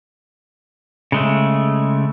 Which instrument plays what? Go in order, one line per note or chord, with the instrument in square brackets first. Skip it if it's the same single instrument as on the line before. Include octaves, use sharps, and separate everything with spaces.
[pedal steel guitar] C#3 G#3 A3